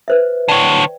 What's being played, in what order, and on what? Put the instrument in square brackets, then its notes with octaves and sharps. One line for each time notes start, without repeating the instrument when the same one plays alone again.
[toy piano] B4 C5 E5
[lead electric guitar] D3 C#5 [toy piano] D5 G5